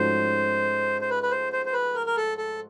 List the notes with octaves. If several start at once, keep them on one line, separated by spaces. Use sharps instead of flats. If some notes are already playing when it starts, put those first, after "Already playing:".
Already playing: G#2 F3 A3 C#4 F#4 C5
C5
B4
B4
C5
C5
C5
B4
A#4
A#4
A4
A4